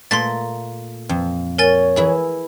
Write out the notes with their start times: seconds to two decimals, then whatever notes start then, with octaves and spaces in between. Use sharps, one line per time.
0.11 A#2 A3 A#3 C6 A6
1.09 F2
1.58 A#4 C#5 G#5 A6
1.96 E3 E4 G#4